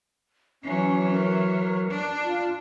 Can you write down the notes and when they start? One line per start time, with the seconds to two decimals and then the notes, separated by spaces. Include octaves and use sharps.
0.63 E3 F#3 C#4
1.12 A#4
1.90 D4
2.24 F4